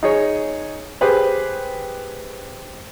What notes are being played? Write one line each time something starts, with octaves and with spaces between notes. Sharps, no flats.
D#4 G#4 C#5
G4 G#4 B4 C5